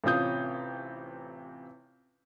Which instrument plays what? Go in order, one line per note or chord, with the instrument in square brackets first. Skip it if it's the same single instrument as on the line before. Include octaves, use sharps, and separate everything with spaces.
[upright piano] A1 C3 C#4 F4 D#6 G6